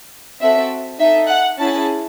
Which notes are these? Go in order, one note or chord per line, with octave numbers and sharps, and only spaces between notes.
C4 F#4 A4 E5
D#4 A4 E5
F#5
C#4 E4 G#4 A5